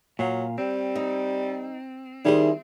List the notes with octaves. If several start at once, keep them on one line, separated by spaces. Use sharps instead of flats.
A#2 F#3 F5
G3 C4
D#4
D#3 G3 E4 G#4 C5